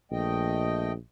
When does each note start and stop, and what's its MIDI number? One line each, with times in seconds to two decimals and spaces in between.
0.12 0.96 34
0.12 0.92 57
0.12 0.92 75
0.12 0.92 79